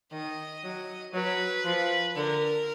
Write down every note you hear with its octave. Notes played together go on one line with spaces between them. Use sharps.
D#3 D#5
F#3
F#3 B4
F3
D3 A#4